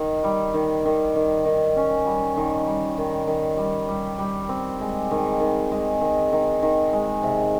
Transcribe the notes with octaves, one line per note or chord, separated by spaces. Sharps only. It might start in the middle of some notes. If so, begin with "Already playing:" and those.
Already playing: D#3
G3
D#3
D#3
D#3
D#3
C#4
G3
D#3
G3
D#3
D#3
G3
G3
G3
C4
G#3
D#3
D#3
G#3
D#3
D#3
D#3
G#3
C3